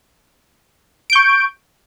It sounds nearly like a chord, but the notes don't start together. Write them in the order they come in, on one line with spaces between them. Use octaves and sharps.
D7 G6 C#6